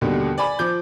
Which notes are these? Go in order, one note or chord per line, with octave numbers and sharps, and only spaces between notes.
D#2 B2 D3 G3
D5 G#5 B5 D6
F3 D6 G6